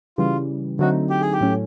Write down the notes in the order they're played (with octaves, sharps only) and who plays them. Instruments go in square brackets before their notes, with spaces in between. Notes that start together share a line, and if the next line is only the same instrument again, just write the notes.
[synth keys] C#3 E3 G3 [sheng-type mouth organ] F4
[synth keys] D3 F#3 A3 C4 D#4 [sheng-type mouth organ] F#4
[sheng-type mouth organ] G4
G#4
G4
[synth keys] A2 F#3 A3 C#4